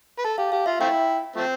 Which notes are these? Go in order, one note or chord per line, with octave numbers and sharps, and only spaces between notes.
B4
A4 A5
G4 F5
G4 F5
F4 E5
A3 C4 E4 G5
F3 A3 C4